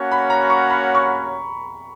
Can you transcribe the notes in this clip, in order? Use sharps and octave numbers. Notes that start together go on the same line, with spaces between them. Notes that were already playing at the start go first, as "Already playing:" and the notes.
Already playing: A#3 C#4 F#4 C#5 F#5
B5
A#5
C#6
B5
C#6